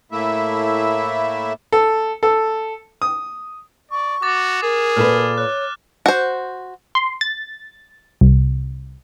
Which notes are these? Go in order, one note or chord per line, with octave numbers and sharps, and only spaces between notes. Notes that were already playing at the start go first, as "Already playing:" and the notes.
A2 A3 A#3 E4 E5
A4
A4
D#6
D5 C#6
F#4 D6 A6
G#4 A#4
A#2 A4 B4 F6 E7
C#5 F#6
F#4 C5
C6
A6
C2